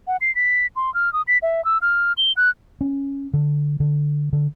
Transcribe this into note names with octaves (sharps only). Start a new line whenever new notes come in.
F#5
C7
B6
C6
F6
D#6
B6
E5
E6
F6
G7
F#6
C#4
D3
D3
D3